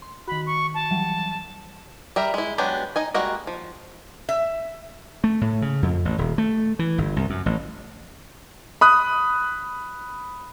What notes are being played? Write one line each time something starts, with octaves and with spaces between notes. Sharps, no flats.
C6
D#3 F#4 B5
C#6
A5
E3 F#3 G3
G3 A#4 E5
G#3 E4
F#3 G#3 B3 D4 G4
D#4 D#5 G#5
G3 G#3 A#3 F#4 D#5
F3
E5
A3
A2
C#3
F2
A1
D#1
A3
E3
G1
C2
F#2
A1
B5 D#6 F#6